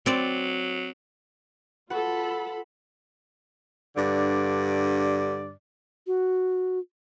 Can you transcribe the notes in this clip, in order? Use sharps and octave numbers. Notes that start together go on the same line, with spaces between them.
F#3 C4 D5
F4 F#4 A4 B4 B5
G2 D3 D5
F#4